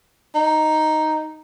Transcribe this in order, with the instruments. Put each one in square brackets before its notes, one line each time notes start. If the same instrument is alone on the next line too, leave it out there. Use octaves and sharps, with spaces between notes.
[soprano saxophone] D#4